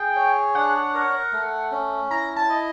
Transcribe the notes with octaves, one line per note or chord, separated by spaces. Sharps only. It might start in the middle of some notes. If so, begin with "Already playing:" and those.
Already playing: G#4 G5
C#5
D4 F#5
A#4
A3
C#4
E4 A#5
A5
D#5